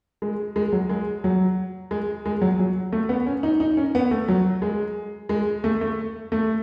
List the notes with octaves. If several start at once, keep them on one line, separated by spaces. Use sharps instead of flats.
G#3
G#3
F#3
G#3
F#3
G#3
G#3
F#3
F#3
A3
B3
C#4
D#4
D#4
C#4
B3
A3
F#3
G#3
G#3
A3
A3
A3